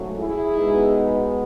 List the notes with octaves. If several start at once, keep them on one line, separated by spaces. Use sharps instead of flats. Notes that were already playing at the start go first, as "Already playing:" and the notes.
Already playing: G#2 F#3 A3 C#4
E4 G#4
B2 G#3 B3 D#4